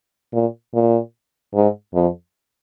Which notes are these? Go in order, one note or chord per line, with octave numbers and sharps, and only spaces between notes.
A#2
A#2
G#2
F2